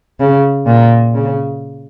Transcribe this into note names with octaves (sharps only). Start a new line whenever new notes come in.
C#3
A#2
C#3